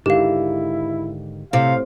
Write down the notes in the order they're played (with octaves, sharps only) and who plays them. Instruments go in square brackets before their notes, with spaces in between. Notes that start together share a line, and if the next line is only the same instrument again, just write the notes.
[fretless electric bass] G#2 D3 D#3 [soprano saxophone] E4 [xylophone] G4 F5
[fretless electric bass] A2 [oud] C3 [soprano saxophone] F5